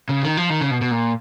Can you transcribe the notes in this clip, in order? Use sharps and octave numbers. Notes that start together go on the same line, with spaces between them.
C#3
D#3
F3
D#3
C#3
B2
B2
A#2